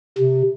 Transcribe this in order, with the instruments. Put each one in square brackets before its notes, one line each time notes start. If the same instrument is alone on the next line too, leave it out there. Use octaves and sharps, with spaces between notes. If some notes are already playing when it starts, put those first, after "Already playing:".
[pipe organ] C3